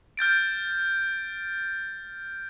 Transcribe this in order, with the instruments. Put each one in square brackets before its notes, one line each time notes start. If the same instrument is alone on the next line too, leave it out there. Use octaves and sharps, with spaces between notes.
[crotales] F6 G6 A6 D7